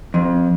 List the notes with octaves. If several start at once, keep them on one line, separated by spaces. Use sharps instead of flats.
F2